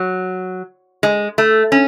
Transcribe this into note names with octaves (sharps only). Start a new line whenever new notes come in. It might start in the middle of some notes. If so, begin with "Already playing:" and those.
Already playing: F#3
G#3
A3
C#4